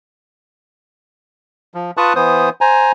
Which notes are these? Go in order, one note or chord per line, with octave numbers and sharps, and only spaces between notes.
F3
F4 B4 A5 C#6 D#6 F#6
E3 B3 C5 D#6
C5 G#5 A#5